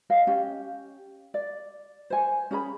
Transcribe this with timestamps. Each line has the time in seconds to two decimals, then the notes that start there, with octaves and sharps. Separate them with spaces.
0.10 D#5 F5 F#5
0.27 C#4 G4
1.34 D5
2.10 C5 G#5
2.51 C#4 G#4 A#5 B5